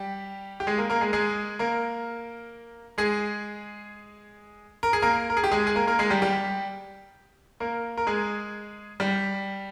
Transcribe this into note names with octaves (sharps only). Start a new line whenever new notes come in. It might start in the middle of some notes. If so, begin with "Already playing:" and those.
Already playing: G3 G4
G4
G#3 G#4
A#3 A#4
A#3 A#4
G#3 G#4
G#3 G#4
A#3 A#4
G#3 G#4
A#4
G#4
A#3 A#4
A#4
G#4
G4
G#3 G#4
G#4
A#3 A#4
A#3 A#4
G#3 G#4
G3 G4
G3 G4
A#3 A#4
A#4
G#3 G#4
G3 G4